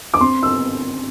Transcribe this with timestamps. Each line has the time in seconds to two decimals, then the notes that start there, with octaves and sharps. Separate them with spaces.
0.14 D6
0.20 C4 C6
0.43 E6